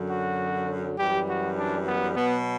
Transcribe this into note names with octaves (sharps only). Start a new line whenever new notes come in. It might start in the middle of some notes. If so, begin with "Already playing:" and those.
Already playing: F#2 D3 F#3
F#4
F#2 E3 G3 G4
F#4
D4
B3
B2 F#3 B3